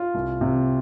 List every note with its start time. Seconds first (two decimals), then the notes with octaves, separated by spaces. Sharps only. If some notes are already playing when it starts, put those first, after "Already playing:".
Already playing: F4
0.14 C2
0.41 C3